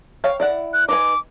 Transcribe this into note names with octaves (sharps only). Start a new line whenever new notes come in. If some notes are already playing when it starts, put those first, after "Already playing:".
C#5 F5 G5
E4 D5 F#5
F#6
D#4 B4 G#5 D6